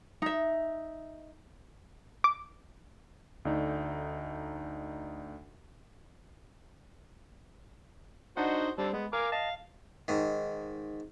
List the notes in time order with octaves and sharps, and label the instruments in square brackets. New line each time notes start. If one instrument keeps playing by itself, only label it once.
[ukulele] D#4 E5
[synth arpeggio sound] D6
[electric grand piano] D2 A3 D4 D#4
[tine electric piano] D4 D#4 F#5 [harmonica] F#4 C5 D#5
[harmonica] D3 C4 A4 [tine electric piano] G3
[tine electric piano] G#3 [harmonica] B3
[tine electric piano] A#4 [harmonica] F5 G#5 D6
[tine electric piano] D#5 A5 [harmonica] F5
[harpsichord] G#2 D#3